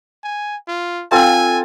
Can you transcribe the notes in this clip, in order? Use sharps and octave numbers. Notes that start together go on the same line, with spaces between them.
G#5
F4
C4 F4 A4 G#5